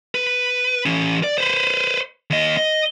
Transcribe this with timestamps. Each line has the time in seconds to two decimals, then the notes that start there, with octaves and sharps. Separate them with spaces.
0.15 B4
0.86 E3 C#4
1.24 D5
1.38 B4 C5
2.30 D#2 D#5
2.57 D#5